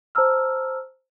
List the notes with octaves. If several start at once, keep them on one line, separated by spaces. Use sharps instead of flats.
C5 A5 A#5 E6 F6